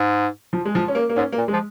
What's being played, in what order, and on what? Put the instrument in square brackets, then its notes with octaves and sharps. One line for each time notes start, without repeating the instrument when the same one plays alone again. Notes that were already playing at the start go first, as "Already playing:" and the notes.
Already playing: [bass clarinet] G#2
[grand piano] F3
G#3
F3
C#4
A#3
A#3
[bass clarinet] G#2 [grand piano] C#4
[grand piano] A#3
[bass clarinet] A#2
[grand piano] G#3
[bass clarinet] F3